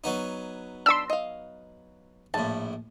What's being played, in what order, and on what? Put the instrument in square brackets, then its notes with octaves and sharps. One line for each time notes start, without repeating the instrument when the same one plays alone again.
[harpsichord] F#3 B3 D#4
[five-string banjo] D4 B5 [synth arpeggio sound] C6 E6
[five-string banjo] D#5 F5
[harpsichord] A#1 A2 [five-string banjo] A5